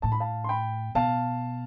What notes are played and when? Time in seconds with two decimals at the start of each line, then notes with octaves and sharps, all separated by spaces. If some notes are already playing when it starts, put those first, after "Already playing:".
0.02 A2 A5
0.12 B5
0.20 F5 A5
0.44 C6
0.49 G5 B5
0.95 B2 F5 A5